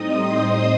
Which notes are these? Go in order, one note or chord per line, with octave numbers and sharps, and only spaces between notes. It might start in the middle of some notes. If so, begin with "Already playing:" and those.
Already playing: A2 G3 C4 D#4 D#5 D#6
C5 C6